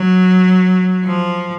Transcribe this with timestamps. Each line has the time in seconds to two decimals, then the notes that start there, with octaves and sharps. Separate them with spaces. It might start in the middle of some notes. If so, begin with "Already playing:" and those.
Already playing: F#3
1.05 F3